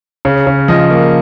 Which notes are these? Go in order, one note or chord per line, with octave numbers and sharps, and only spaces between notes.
C#3
C#3
F3 D#5
A#3